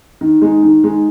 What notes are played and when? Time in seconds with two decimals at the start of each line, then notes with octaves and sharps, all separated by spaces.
0.21 D#3
0.42 G#3 D#4
0.63 D#3
0.84 G#3 D#4